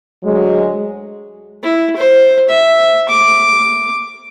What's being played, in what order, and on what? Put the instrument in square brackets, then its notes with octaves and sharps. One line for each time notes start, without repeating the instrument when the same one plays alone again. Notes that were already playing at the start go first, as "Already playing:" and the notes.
[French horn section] D2 F#3 G#3
[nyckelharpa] E4
C5
E5
D6